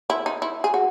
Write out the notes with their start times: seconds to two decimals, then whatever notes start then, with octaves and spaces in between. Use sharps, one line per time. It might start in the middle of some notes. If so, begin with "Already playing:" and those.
0.10 E4
0.26 D#4
0.42 E4
0.64 G#4
0.74 F#4